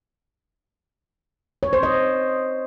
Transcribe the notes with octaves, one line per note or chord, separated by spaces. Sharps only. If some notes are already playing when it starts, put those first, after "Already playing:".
C#5
C5
D#5